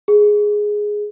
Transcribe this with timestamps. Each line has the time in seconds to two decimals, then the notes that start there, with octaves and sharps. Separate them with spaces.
0.08 G#4